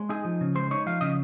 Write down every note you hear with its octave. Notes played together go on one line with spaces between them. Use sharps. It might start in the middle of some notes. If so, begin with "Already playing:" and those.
Already playing: G#3
D#4 G#4
F3
C#3
G#3 C5
D#4 C#5
F3 F5
C#3 D#5